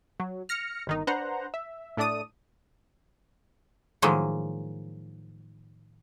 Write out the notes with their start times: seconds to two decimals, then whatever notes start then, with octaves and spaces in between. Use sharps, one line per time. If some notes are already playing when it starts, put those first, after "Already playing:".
0.20 F#3
0.49 F6 A#6 C#7
0.87 G1 D#3 D#4
1.07 D4 B4 C5 F#5 A#5
1.54 E5
1.97 A2 A3 D4 D5 D#6 D#7
4.02 A2 D#3 F3 F#3 G#3 A#3